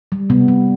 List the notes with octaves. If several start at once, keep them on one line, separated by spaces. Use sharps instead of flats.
G3
C3 B3
G3